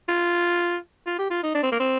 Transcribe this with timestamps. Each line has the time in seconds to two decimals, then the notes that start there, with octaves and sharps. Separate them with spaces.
0.08 F4
1.06 F4
1.19 G4
1.30 F4
1.43 D#4
1.55 D4
1.63 C4
1.72 A#3
1.80 C4